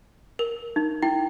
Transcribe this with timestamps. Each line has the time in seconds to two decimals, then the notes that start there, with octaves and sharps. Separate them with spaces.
0.39 A#4
0.76 D#4
1.03 E4 G5